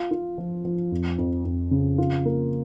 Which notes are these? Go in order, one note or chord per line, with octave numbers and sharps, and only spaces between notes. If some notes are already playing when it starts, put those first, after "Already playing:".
Already playing: F4
F4
F3
F3
F2
F2
F2
C#3
F4
A#3